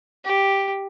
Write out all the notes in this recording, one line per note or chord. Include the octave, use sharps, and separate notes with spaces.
G4